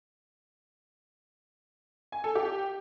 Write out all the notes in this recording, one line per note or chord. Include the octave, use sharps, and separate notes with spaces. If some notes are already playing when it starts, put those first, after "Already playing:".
G#5
A4
G4